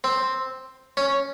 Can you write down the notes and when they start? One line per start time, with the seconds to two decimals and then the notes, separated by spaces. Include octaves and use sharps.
0.04 C4
0.97 C#4